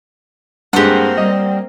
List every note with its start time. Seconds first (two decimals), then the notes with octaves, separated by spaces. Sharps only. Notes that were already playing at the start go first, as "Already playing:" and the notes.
0.73 G2 G#3 A#3 C4 G4 F#5
1.18 G3 D#5